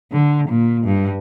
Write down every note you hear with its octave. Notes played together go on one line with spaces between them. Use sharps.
D3
A#2
G2